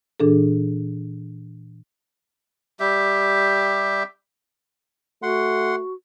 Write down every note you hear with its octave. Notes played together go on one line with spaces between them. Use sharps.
A#2 E3 D4 G#4 A4
G3 G4 E5
A3 F#4 F#5 C6